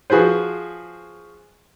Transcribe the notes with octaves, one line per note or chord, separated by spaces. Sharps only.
F3 F#4 G#4 B4 C5